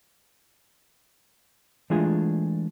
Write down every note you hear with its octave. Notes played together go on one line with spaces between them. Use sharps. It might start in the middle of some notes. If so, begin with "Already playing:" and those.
E3 G#3 A3 D4 F4 G#4